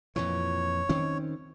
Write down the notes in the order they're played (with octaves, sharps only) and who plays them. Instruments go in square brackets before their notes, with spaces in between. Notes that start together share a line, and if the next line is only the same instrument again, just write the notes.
[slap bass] F2 A#2 E3 [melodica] C#5
[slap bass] D#3 C4 C#4